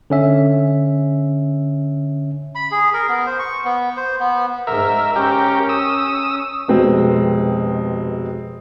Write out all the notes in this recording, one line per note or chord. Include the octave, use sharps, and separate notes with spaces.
D3 C#4 E5
B5
G#4
A#4
B3
C5
C#6
B3
C5
B3
G#2 A#4 E5
C#4 G4 A#4
D#6 E6
F1 B2 G#3 C4